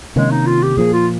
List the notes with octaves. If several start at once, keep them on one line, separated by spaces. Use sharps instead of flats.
C3 D#3 G#3 A#3 C#4
D#4
F4
G4
A#2 F3 A#3 G#4
F4